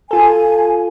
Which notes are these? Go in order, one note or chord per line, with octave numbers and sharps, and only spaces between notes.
F4 A4 G#5